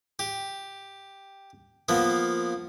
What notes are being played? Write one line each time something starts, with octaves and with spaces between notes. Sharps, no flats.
G4
F3 A#3 B3